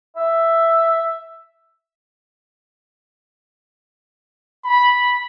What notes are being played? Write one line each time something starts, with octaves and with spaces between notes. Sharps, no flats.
E5
B5